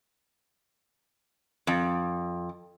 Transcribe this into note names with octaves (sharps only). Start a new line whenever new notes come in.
F2